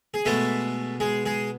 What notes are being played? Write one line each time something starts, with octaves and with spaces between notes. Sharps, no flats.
G#4
B2 G#3 A3 B3 A4
G#3 G#4
G#3 G#4